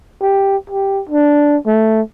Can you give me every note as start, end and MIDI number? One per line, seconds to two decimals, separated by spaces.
0.21 0.57 67
0.70 1.02 67
1.09 1.57 62
1.66 2.01 57